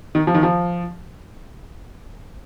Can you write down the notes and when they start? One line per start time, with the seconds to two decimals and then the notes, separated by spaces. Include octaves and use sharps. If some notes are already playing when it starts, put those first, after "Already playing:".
0.15 D#3
0.27 F3
0.34 D#3
0.43 F3